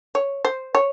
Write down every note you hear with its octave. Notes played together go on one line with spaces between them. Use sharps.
C#5
C5
C#5